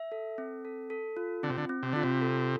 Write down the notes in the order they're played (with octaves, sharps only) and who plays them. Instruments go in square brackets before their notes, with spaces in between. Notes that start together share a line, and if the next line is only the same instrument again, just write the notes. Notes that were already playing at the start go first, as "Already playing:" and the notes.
Already playing: [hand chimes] E5
A4
C4
A4
A4
F4
[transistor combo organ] D3 [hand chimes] C4
[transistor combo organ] C3
D3
[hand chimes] C4
[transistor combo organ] C3
[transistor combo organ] D3 [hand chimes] F4
[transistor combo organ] C3
[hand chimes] A4